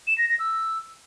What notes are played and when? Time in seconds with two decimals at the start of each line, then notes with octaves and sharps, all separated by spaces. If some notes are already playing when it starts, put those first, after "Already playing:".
0.07 E7
0.18 A#6
0.29 A#6
0.39 E6